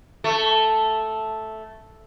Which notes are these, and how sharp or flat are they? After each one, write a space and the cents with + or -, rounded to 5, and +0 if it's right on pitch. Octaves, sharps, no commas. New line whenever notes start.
A3 -5